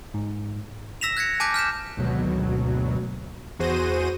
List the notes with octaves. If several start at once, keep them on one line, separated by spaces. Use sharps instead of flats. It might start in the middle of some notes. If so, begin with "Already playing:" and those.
G#2
E6 A#6 B6 E7 F7
F#6 G#6 A#6 C#7
G#5 A5 D6 F#6 G6 B6
F6 G6 B6 E7
G#1 D2 B2 F#3
E2 F#4 G#4 C5 A#6 D#7